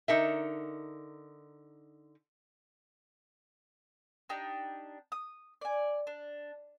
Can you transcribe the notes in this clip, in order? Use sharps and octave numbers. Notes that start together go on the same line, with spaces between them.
D3 D#4 A#4 E5
D4 D#4 G4 G5
D#6
D5 G#5
D4